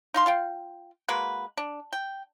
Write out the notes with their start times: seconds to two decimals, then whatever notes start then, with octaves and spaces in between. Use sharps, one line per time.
0.14 D#4 F5 C6
0.26 F4 F5 G5
1.09 G#3 A#3 F#4 B4
1.57 D4
1.93 G5